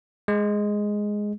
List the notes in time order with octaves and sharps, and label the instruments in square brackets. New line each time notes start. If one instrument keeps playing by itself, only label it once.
[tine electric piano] G#3